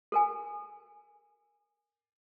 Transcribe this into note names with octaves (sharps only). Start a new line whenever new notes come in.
A4 A#4 G#5